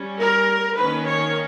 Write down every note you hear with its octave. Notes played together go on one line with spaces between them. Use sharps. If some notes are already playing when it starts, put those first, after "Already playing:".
Already playing: G3 C#4
A#4
D#3 A#3 C#4 B4
C#5